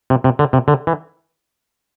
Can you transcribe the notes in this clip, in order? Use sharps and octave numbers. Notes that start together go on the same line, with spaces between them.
C3
C3
D3
C3
D3
E3